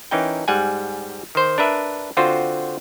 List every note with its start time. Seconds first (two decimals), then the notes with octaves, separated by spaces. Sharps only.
0.11 E3 C#4 D#4 A#4 G5
0.48 G#2 G3 F#5 G#5
1.35 D#3 C5
1.58 D4 A#4 B4 E5
2.17 D3 C4 F4 F#4 C5